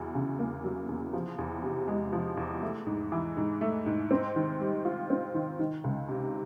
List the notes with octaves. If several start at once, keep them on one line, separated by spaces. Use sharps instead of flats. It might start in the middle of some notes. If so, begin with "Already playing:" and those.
Already playing: E2 F#3
C#3
A#3
F#3
E2
F3
E2
C3
G#3
F3
E2
A3
G#2
E3
G#2
A3
G#2
C4
D#3
G3
F4
C4
D#3
D#3
C#2
C3